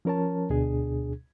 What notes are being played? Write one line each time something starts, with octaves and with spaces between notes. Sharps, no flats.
F3 C#4 A#4 C#5 A5
D2 B2 D4 G#4